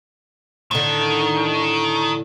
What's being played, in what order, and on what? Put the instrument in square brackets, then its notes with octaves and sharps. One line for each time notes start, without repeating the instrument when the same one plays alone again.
[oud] A2 D3 [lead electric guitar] D#3